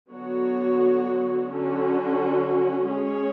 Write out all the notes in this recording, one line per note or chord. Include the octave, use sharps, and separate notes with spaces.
D3 F#3 B3 F#4 C#5
D3 F#3 C#4 F#4
G#3 C#4 G#4 C#5